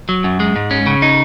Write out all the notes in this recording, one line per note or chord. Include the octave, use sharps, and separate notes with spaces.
F#3
F#2
G#3
G#2
C#4
C#3
D#4